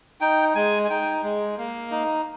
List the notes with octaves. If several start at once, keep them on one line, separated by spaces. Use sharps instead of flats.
D#4 G5
G#3 G#5
G#5
D#4 G5
G#3
A#3
D#4